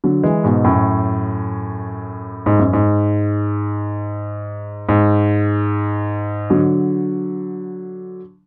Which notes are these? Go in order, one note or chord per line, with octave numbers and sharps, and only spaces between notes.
D3 F#3
E3 G#3
G#2 B2
F#2 A2
G#2
F#2
G#2
G#2
D3 F#3